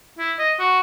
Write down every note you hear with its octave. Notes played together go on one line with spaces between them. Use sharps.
E4
D#5
F#4